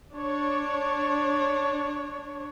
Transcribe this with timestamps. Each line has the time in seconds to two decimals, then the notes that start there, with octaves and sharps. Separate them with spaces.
0.15 D4 C#5